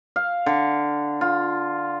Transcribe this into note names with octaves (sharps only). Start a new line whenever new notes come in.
F5
D3
F4